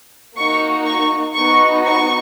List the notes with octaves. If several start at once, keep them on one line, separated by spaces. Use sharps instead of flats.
A#3 D#4 F#4 C#6
C#6
B3 D#4 F#4 C#6
C#6